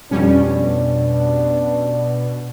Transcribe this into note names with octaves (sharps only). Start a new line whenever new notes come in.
F2 B2 G3 C#4 D4